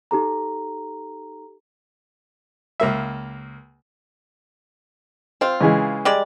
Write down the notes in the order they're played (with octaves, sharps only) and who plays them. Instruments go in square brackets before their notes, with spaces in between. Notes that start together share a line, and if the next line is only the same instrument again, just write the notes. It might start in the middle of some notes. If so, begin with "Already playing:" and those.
[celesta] D#4 G4 A4 A#5
[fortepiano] C#2 A#3 E5
[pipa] C4 F4 [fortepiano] C5
[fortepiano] C#3 E3 G#3
[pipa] G3 G#3 D5